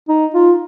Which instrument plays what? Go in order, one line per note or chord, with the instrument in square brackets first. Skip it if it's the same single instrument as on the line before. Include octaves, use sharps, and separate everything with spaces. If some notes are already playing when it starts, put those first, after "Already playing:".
[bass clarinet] D#4
F4